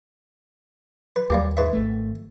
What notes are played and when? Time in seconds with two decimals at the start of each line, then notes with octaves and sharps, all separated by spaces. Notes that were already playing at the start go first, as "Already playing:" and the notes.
1.16 B4
1.30 D#2 G3 A#3 G4
1.57 G#2 B4 E5
1.73 G#1 A3